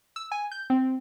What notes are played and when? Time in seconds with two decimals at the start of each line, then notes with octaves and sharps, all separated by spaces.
0.16 E6
0.32 G#5
0.51 G6
0.70 C4